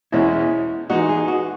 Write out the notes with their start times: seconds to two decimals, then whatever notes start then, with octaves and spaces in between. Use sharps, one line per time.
0.12 E2 B2 G#3 C#4 E4
0.90 E3 G#3 D#4 F#4
1.09 G#4
1.28 F#4